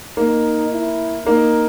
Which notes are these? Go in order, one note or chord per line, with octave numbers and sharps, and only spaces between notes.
A#3 D#4
E4
A#3 D#4